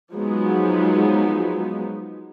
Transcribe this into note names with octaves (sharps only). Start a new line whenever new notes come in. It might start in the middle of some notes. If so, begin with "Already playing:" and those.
F3 F#3 G#3 B3 D#4